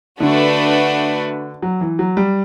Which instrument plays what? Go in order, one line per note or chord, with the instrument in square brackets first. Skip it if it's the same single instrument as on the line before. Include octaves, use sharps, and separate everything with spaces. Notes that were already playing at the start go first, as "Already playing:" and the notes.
[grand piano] D3 [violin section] A3 D4 F#4 B4
[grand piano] F#3
E3
F#3
G3